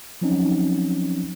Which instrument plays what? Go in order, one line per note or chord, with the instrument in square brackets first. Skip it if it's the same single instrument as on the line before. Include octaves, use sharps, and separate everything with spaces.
[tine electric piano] F3 F#3 C4 C#4 D#4